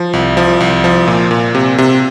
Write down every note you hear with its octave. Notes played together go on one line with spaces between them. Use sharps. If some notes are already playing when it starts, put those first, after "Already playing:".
Already playing: F3
C2
F3
C2
F3
A#2
A#2
C3
C3